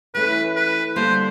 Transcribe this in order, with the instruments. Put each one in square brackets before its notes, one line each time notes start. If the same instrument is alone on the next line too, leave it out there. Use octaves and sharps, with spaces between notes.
[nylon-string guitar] E3 A3 C#4 [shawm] B4
[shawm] B4
[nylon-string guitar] D3 G3 A#3 [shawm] C5